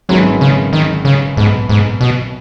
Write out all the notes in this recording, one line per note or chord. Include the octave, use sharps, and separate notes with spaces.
G#1 F#2 D#3 F#3 G#3 B3
C#3
D#3
C#3
B1 G#2 B2 B3
G#2
B2